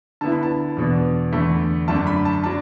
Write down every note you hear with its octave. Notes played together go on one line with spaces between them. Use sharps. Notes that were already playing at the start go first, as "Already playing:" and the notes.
D3 B3 E4 A5
B5
A5
E2 B2 B3 D4
E2 D3 A3 B5
F#2 D3 A3 D4 A5
B5
A5
F#3 D4 A5